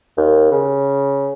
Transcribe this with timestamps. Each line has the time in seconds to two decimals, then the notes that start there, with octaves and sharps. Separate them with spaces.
0.17 D#2
0.51 C#3